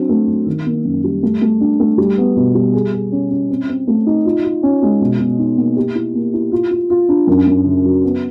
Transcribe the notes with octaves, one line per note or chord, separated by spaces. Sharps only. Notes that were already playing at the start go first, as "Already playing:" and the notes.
Already playing: F#3 C4 D4
A3
F#3
D#3
A#3
F#2
G3
A3
A3
D4
A3
G3
B3
B2
G3
G#4
G#4
C#4
C#4
C4
C4
A3
D#4
F4
F4
C#4
G#3
B2
B2
D#4
A#3
G4
E4
A#3
E4
F4
F4
F4
D4
F#2
F#2
C#3
F#3
B3